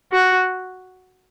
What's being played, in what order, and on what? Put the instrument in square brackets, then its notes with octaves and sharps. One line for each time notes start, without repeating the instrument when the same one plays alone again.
[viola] F#4